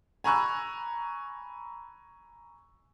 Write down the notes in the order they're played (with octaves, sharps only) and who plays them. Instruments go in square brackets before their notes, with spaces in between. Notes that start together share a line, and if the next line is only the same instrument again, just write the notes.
[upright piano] G#5 A#5 B5 C#6 E6 F#6